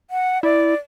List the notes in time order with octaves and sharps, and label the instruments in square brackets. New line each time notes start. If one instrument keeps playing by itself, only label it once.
[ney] F#5
[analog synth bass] E4 [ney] D5